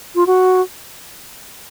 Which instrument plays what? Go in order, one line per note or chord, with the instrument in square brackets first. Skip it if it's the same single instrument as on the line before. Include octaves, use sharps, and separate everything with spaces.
[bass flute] F4
F#4